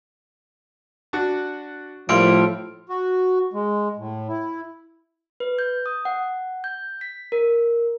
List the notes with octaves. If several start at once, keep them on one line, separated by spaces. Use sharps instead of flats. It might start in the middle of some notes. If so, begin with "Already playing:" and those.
D4 F#4
A2 F3 G3 A#3 E5 C6 F6 D7
F#4
G#3
A2
E4
B4
G6
D#6
F#5
G6
B6
A#4